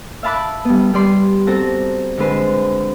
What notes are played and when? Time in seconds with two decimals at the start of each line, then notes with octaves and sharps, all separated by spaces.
0.23 E5 F5 A5 B5 D6 F#6
0.65 G3 B3
0.94 G3 B3 D5 C6
1.47 C4 F#4 A4 A#5
2.18 D3 G#3 B4 C5